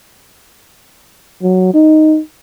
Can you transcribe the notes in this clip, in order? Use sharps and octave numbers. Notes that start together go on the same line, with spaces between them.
F#3
D#4